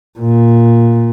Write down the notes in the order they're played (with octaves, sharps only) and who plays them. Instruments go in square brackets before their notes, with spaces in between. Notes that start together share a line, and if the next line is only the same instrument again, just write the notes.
[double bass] A#2